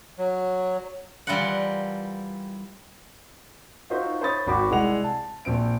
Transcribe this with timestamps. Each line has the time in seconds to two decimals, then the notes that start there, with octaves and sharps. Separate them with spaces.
0.18 F#3
1.27 E3 G3 E4 F4 A#4 F#5
3.90 D#4 F4 F#4 C5 E5
4.21 C5 C#5 B5 D#6 A6
4.47 G#1 F#4 B5 D6
4.70 C2 G#3 E4 D5 F#5 F7
5.04 A5
5.45 A#1 C4 D7